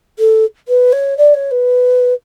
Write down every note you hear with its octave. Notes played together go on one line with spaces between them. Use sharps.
A4
B4
C#5
D5
C#5
B4